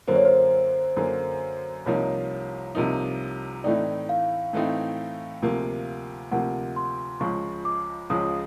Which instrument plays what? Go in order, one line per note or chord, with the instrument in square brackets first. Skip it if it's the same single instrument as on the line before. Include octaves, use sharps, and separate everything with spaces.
[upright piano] F#2 D3 F#3 A#3 [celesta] C5
[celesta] C#5
C5
[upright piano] F#2 D3 F#3 A#3
[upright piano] C2 C3 F3 A#3 D#4 [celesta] C#5
[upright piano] C2 C3 F3 A#3 D#4
[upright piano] A2 E3 A3 C4 D#4 [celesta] D5
[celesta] F5
[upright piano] A2 E3 A3 C4 D#4
D2 C3 F3 A#3
[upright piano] D2 C3 F3 A#3 [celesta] F#5
[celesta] C6
[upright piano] C#2 C#3 F3 G#3 [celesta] C#6
[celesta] D6
[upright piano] C#2 C#3 F3 G#3 [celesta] D#6